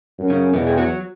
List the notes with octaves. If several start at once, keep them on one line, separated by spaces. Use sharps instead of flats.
F#2
C#3 C#4
E2 B2 B3
G#4
F#3 F#4